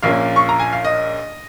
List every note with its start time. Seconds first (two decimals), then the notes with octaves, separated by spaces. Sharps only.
0.03 A#1 A#2 A#3 C#4 F5
0.36 C#6
0.49 A#5
0.59 G#5
0.73 F5
0.85 D#5